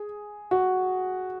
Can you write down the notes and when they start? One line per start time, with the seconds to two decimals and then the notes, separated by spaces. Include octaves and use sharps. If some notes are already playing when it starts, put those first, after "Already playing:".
Already playing: G#4
0.51 F#4